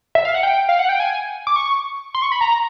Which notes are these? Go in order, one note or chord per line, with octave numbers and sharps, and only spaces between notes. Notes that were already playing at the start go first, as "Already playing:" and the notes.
E5
F5
F#5
G5
F5
F#5
G5
G#5
D6
C#6
C6
C#6
B5
A#5